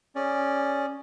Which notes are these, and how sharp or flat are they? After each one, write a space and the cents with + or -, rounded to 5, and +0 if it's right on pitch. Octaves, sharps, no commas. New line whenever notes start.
C#4 +0 G#4 -20 D5 +0